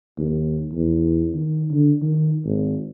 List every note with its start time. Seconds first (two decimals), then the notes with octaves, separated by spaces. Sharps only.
0.18 D#2
0.73 E2
1.35 D#3
1.71 D3
2.02 D#3
2.45 G#1